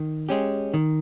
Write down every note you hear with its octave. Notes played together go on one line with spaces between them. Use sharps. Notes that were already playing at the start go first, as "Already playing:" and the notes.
Already playing: D#3
G#3 C#4 G4
D#3